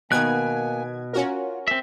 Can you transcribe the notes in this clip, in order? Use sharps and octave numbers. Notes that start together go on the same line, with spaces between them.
B2 D#3 A#3 B3 G#5 F#6 G#6
C#4 F4 F#4 A#4
C4 E5